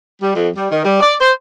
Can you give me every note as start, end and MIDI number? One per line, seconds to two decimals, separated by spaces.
0.22 0.34 55
0.35 0.49 41
0.56 0.69 55
0.71 0.85 51
0.85 1.00 55
1.01 1.15 74
1.20 1.32 72